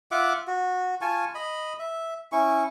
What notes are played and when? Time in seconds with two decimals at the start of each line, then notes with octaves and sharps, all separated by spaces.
0.11 F4 E5 F#5 D6
0.47 F#4
1.01 F4 G#5 A5 C#6
1.35 D#5 B5
1.79 E5
2.32 C#4 E4 C#6